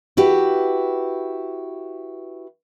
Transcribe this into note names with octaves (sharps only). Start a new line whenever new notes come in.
E4 F#4 G4 B4